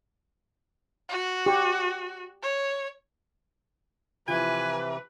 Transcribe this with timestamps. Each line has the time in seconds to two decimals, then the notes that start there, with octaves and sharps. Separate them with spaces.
1.09 F#4
1.46 G4 C#6
2.43 C#5
4.28 C3 E3 F3 E4 B4 G#5